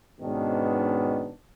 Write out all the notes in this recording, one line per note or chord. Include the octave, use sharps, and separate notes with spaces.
G#2 B2 D#3 B3 C#4 D4